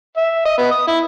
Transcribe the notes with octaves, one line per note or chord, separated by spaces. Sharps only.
E5
D#5
B3
D#6
E4